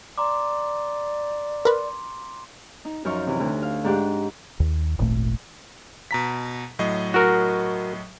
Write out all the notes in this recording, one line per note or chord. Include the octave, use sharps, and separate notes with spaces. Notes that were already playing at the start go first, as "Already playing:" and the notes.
D5 A#5 C6 D6
A#4 B4 C6
D#4
F#2 F3 D#4 C#6 F6
C3 E3
D2
F5
G#2 D4 G4 F#6
D#2
D#1 G#1 A#2 A3
B2 A#5 B6
A2 F#3 D#5
F#4 A#4